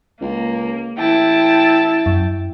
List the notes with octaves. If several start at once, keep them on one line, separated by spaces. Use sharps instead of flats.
C#2 A#3
A1 E4 G5 A5
F#2